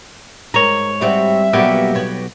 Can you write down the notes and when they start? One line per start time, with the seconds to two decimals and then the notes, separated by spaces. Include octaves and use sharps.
0.54 G#2 A#4 C#5
1.01 G3 C4 F#4 E5
1.53 B1 G3 A#3 B3 F#4 G4
1.95 B3 C#5